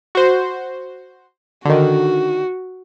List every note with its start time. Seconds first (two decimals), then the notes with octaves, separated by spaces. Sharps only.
0.15 F#4 C5
1.65 D3 D#3 F#4